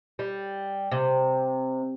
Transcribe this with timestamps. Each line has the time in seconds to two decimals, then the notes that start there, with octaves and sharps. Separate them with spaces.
0.19 G3
0.91 C3